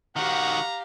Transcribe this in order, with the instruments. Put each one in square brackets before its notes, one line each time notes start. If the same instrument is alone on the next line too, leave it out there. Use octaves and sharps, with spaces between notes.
[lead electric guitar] D#3 F#4 [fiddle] G4 F5 [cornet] F#5 [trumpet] A#5